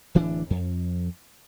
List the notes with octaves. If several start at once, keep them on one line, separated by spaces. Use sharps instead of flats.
D1 E3 D4
F2